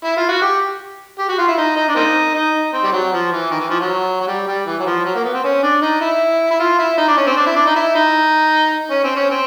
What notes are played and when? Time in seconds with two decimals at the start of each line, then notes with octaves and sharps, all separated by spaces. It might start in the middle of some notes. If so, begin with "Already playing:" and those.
0.05 E4
0.17 F4
0.29 F#4
0.42 G4
1.19 G4
1.29 F#4
1.38 F4
1.48 E4
1.58 D#4
1.77 D#4
1.88 D4
1.96 A#3 C4 D#4
2.34 D#4
2.73 C4
2.84 G3
2.92 F#3
3.12 F3
3.32 E3
3.51 D#3
3.60 E3
3.70 F3
3.80 F#3
4.21 F#3
4.27 G3
4.47 G3
4.66 E3
4.80 F#3
4.86 F3
5.05 F#3
5.15 A#3
5.24 B3
5.34 C4
5.44 C#4
5.63 D4
5.82 D#4
6.01 E4
6.51 E4
6.60 F4
6.79 E4
6.98 D#4
7.08 D4
7.17 C#4
7.27 C4
7.37 D4
7.46 E4
7.56 D4
7.66 D#4
7.76 E4
7.95 D#4
8.91 C#4
9.04 C4
9.16 C#4
9.30 C4